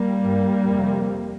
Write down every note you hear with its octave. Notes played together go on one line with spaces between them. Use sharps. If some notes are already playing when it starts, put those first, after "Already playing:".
Already playing: G3 A#3
G2
F2 C3